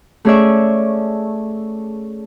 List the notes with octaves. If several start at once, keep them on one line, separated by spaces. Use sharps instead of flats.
A3 C#4 G#4 C#5 D5 E5